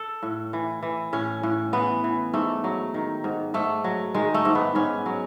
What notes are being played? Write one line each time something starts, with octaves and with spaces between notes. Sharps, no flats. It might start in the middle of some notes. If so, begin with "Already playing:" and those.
Already playing: A4
A2
E3
E3
A2 C#4
A2
E3 B3
E3
G#2 A3
F#3
D#3
G#2
G#2 A3
F#3
D#3 G#3
A3
G#2
B3
G#2 C#4
F#3